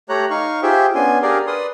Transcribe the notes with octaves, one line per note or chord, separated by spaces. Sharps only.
A3 G4 C#5 A#5 F#6
D#4 F5 C#6
F4 G4 G#4 C5 E5 G5
B3 C#4 D4 G#5 C6
D4 G4 G#4 A#4 D5 F5
B4 D5 C6 D#6